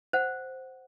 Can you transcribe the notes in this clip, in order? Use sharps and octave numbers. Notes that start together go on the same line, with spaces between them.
C5 F#5